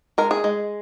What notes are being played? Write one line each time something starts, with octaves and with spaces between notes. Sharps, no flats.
G#3 A#4
G#4
G#3